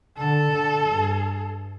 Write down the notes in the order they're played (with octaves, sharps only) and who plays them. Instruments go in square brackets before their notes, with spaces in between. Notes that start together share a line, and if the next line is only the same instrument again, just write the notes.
[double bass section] D3 [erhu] A4
[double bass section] D3
G2